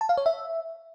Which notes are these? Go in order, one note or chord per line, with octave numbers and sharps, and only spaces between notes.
A5
F5
C#5
E5